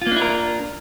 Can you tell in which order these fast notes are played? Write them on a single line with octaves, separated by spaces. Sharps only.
F4 A#3 D4 E4 A#4